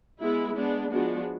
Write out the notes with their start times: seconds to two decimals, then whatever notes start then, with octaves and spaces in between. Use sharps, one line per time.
0.20 G#3 B3 E4
0.55 G#3 B3 D4
0.90 F3 G#3 B3 D4 F#4